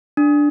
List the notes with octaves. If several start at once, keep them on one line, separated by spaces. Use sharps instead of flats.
D4